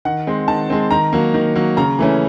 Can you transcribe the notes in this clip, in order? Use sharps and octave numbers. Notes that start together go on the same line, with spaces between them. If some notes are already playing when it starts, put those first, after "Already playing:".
D#3 F#5
G#3 C4
D#3 A5
G#3 C4
D#3 A#5
F#3 A#3
D#3
F#3 A#3
C#3 A#5
E3 A3 C#4